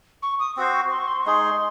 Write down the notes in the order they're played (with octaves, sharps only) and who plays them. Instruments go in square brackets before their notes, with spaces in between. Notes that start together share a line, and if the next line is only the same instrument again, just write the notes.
[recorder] C#6
D#6
[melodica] C4 F#4 C5 [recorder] C#6
[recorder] C6
C#6
C6
C#6
[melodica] G#3 D#4 G#4 [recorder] C6